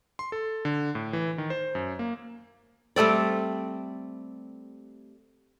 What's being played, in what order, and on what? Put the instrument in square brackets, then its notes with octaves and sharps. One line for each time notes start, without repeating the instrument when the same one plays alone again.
[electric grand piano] C6
A4
D3
A2
E3
D#3
C5
F#2
A#3
[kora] G3 A3 C4 D5